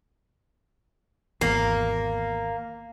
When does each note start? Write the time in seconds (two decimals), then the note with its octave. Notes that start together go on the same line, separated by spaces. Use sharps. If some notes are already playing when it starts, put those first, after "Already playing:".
1.41 G#1 E2 A#3